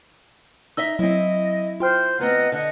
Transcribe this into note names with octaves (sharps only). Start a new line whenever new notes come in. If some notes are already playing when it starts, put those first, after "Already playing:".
D#4 D#5 E5 E6 B6
F#3 C4 E4 D#5
F4 C5 G5 F6
D2 B3 C4 D#5 F#5 A#5
D3 D#5 F#5